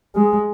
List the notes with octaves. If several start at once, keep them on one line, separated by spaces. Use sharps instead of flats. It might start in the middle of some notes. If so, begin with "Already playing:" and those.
G#3